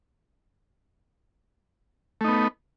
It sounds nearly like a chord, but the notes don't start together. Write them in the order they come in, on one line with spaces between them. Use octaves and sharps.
A3 D#4 B3